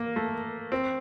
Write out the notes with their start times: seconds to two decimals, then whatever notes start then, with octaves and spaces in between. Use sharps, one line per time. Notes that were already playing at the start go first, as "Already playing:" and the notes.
Already playing: A#3
0.16 A3
0.72 C4